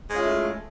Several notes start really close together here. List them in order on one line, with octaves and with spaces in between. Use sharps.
G#3 C#4 F4 E4 A3